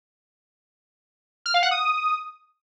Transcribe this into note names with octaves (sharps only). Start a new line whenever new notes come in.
F6
F5
F#5
D#6